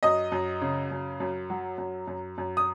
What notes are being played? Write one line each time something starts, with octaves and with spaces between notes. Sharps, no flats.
F#2 D#5 D#6
F#2
C#3
F#2
F#2
F#3
F#2
F#2
F#2
D#6